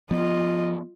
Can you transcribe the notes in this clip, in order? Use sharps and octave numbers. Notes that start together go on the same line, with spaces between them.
F3 B3 F4 D#5